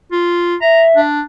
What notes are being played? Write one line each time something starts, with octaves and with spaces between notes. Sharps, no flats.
F4
E5 A#5
D4